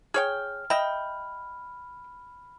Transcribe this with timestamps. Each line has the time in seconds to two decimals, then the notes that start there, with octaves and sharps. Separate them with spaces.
0.14 G#4 C#5 G5 F6
0.70 D#5 E5 G5 B5